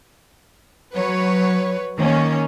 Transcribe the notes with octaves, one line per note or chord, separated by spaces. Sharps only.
F#3 B4 C#5
D#3 A#3 C#4